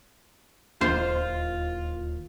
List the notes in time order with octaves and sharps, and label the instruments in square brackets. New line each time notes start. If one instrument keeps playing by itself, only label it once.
[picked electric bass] D1 D#2 [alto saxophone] F4 [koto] C5